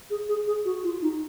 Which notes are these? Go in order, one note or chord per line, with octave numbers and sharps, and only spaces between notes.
G#4
G#4
G#4
F#4
F4
D#4